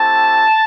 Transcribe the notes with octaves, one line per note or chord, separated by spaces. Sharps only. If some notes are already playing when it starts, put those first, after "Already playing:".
Already playing: A3 C4 E4 G4 A5